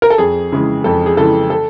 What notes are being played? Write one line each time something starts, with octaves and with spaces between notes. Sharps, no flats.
A#4
A4
F2 G#4
C#3 E3 G#3
F2 A4
G#4
C#3 E3 G#3 A4
A4